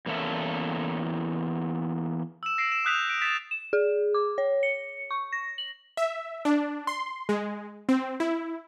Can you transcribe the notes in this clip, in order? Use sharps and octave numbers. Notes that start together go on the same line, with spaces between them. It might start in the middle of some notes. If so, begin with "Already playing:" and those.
E2 A#3 C#4 A4 E5
E6 E7
A#6 C7 D7
E7
D#6 E6 F#6 G6 B6 F7
D7
A6 B6 E7
E7
G#4
D6
C#5
C#7
C#6
A#6
F#7
E5
D4
C6
G#3
C4
E4